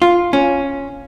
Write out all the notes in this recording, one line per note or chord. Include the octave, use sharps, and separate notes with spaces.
F4
C#4